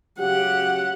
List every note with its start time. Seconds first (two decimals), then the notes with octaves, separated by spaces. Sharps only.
0.19 C#3 F#3 G4 F#5